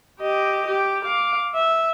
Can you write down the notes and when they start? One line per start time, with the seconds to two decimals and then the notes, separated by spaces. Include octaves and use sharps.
0.21 G4 D#5
0.67 G4
1.04 F5 D6
1.55 E5